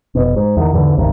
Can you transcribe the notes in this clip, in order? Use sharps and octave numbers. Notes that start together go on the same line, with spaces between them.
F1 B2
G#2
E2 D#3
E2 G#2 D3 E3
E1 C2 G2 D#3